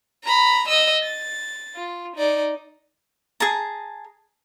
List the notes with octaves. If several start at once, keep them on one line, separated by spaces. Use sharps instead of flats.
A#5 B5
D#5 E6
A6
F4
D#4 D5
G#4 A5 A#5